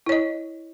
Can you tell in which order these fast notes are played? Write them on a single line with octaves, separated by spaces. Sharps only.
E4 C#5 D#5